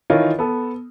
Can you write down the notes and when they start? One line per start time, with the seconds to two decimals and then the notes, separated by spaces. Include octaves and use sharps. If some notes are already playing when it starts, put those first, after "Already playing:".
0.10 D#3 E3 F4 A#4 C#5 D#5
0.39 B3 A4